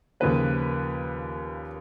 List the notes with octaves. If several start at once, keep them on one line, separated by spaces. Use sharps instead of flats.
D#2 C#3 F3 A#3 B4